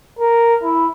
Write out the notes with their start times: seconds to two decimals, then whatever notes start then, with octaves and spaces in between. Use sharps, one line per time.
0.19 A#4
0.63 E4